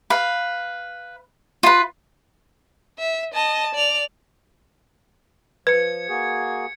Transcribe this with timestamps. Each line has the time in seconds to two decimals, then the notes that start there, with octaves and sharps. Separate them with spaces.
0.10 B4 F5
1.63 F4 B4
2.99 E5
3.34 D#5 A5
3.75 D5 F7
5.67 F3 B4 G#6 C#7
6.09 A#3 F#4 G#4